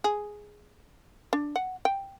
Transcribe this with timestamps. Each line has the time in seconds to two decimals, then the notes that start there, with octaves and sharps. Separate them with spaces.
0.04 G#4
1.33 D4
1.56 F#5
1.85 G5